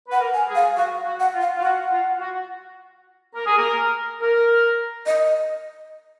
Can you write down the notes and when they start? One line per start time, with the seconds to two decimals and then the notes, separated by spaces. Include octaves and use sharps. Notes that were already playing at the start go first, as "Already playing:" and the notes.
0.08 B4 F#5
0.19 A#4
0.34 G#5
0.48 G#4
0.55 F5
0.76 F#4 F5
1.05 F#4
1.20 F#5
1.34 F4
1.41 F5
1.57 F4
1.62 F#4 F#5
1.92 F4
2.20 F#4
3.35 A#4
3.46 G#4
3.57 A#4
4.21 A#4
5.06 D#5